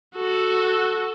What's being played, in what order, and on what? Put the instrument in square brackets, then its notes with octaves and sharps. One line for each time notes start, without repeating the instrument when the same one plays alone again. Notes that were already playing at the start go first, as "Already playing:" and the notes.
[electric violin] F#4 A4